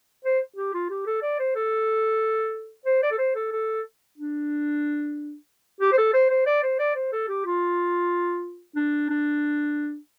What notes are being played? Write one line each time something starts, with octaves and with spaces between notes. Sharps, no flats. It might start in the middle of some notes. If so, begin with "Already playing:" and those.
C5
G4
F4
G4
A4
D5
C5
A4
C5
D5
A4
C5
A4
A4
D4
G4
C5
A4
C5
C5
D5
C5
D5
C5
A4
G4
F4
D4
D4